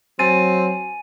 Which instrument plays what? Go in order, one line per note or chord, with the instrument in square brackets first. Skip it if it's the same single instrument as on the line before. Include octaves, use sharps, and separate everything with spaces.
[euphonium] F#3 [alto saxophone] C4 [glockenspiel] G#5 A6 D#7